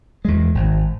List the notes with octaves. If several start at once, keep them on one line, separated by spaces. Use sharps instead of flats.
E2 G#3
G#1